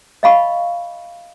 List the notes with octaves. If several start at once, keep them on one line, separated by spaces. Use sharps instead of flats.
D#5 F5 B5 C#6